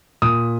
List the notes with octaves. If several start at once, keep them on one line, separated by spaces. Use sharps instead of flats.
A#2 D#6